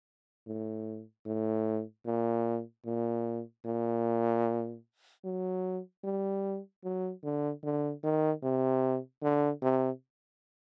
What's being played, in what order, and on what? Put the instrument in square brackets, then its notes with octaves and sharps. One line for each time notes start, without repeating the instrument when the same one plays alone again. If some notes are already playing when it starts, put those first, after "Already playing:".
[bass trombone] A2
A2
A#2
A#2
A#2
F#3
G3
F#3
D3
D3
D#3
C3
D3
C3